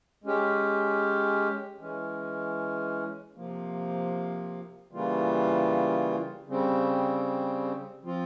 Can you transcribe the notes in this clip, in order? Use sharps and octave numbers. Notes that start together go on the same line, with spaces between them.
G#3 C#4 G4
E3 G#3 C#4
C3 F3 A#3
C#3 E3 G3 A#3 F4
C#3 G3 C4
F3 C4 F4